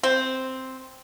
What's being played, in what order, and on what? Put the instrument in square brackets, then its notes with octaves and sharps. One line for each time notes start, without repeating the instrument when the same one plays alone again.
[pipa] C4